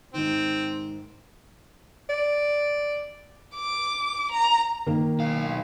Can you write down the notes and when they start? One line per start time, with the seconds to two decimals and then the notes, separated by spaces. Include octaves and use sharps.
0.14 G#2 D#3 C4
2.09 D5
3.56 D6
4.32 A#5
4.87 D#3 A#3
5.19 B1 F5